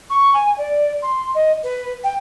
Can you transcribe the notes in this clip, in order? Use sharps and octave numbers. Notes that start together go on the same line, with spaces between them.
C#6
G#5
D5
C6
D#5
B4
G5